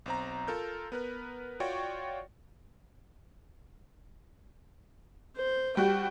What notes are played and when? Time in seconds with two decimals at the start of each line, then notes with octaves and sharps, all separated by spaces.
0.06 B1 C4 A#5
0.47 F4 A4 A#4 G6
0.92 B3 A#4 B4
1.60 F4 F#4 C#5 D5 G5 C#6
5.37 C5
5.77 G3 F#4 G5